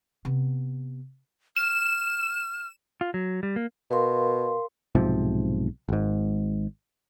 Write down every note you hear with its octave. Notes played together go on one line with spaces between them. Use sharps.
C3 B3
F6 E7
F4
F#3
G3
A#3
B2 A#4 F5 C6
B1 G#2 C3 F3
G#1 G#2